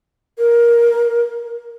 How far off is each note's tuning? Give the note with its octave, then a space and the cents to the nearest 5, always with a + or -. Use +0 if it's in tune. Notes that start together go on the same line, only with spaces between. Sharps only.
A#4 +15